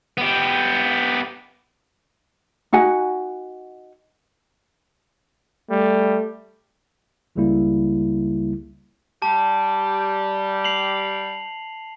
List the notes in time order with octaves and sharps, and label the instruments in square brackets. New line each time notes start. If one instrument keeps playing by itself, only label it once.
[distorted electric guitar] B3 G4
[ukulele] D#4 F#4 F#5 G#5
[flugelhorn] G3 [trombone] A3
[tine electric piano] G#1 C#2 C#3 G3 A#3 E4
[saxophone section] G3 G4 [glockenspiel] A5
[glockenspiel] C7 F7 F#7